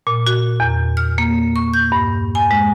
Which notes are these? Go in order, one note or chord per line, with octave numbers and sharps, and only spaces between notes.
A#2
F#4
E2
F6
A#3
C#6
G6
G2
G#5
G#3